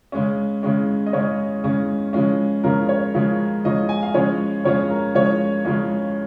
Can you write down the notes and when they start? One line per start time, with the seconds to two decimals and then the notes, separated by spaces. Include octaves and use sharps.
0.12 C#3 G#3 C#4
0.63 C#3 G#3 C#4
1.06 D#5
1.13 C#3 G#3 C#4 C#5
1.64 C#3 G#3 C#4
2.13 C#3 F3 G#3 C#4
2.64 C#3 F3 G#3 C#4 A#4
2.89 C#5
3.14 C#3 F3 G#3 C#4
3.65 C#3 F3 G#3 C#4 D#5
3.89 G#5
4.03 F5
4.14 C#3 F3 G#3 C#4 C#5
4.64 C#3 F3 G#3 C#4 C#5
4.90 A#4
5.15 C#3 F3 G#3 C#4 C#5
5.65 C#3 F3 G#3 C#4